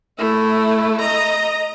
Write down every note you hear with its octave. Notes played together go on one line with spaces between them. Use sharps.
A3 E4
D#5 A#5